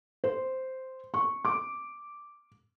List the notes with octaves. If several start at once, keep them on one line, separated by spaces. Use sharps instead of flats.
C5
C#6
D6